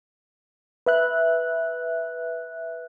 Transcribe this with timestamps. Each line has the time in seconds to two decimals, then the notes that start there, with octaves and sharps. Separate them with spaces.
0.86 B4 E5 F#6